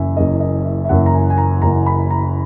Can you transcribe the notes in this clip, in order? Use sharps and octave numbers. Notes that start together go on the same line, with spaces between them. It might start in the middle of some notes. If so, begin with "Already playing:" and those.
Already playing: F#1 F#2 E3 A#3 E5 G#5
F#1 F#2 E3 A#3 D#5
D#5
E5
E5
F#1 F#2 E3 A#3 F#5
A#5
G#5
G#5
A#5
F#1 F#2 E3 A#3 A#5
B5
A#5